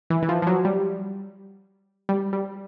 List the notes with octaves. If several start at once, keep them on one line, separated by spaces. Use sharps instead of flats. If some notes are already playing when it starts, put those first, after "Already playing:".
E3
E3
F3
F3
F#3
G3
G3
G3